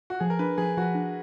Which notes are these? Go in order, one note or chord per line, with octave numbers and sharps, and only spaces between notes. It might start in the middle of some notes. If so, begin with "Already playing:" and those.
F#4
F3 G#4
A#4
D4 B4
F3 G#4
F3 F#4
D4